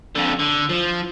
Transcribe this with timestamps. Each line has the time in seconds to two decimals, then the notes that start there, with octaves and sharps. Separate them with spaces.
0.16 F2 D3
0.40 D3
0.70 F3